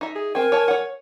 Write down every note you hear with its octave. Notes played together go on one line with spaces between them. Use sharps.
D#4 E5
G#4
C4 A#4 G5 G#5
C#5 A5
C#5 F#5